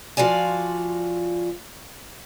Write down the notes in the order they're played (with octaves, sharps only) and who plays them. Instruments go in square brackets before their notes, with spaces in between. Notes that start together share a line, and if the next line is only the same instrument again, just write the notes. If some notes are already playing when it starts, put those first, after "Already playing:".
[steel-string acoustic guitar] F3 F4 F#4 D5 G#5